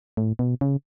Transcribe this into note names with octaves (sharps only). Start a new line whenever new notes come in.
A2
B2
C#3